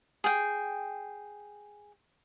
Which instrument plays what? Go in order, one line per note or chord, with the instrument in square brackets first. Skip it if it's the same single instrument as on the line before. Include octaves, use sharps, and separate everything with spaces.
[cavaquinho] G#4 G5